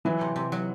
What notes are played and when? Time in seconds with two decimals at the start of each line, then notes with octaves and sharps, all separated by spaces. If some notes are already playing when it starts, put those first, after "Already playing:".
0.05 E3 F#3 E4
0.21 C3
0.36 C3
0.52 F#3